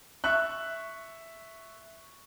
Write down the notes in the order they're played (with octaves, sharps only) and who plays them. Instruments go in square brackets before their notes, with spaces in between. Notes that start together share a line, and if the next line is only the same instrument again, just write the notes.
[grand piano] E5 C#6 F#6